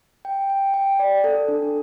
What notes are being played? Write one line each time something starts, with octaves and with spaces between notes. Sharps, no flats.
G5
G5
G5
D5
A4
D4